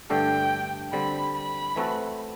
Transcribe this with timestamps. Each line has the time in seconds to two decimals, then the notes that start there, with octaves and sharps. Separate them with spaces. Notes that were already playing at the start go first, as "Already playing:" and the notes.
0.10 G2 D3 A3 D4 A4 G5
0.93 D3 G3 C4 B5
1.34 B5
1.76 E3 A3 C4 F#4 A4